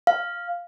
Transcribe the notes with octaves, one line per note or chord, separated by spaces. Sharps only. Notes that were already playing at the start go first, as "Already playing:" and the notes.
F5